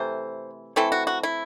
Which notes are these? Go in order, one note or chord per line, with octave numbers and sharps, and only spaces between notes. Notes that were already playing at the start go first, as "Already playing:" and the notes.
Already playing: C3 E3 A3 C5
E3 A3 C4 E4 A4
F#4
F#4
E4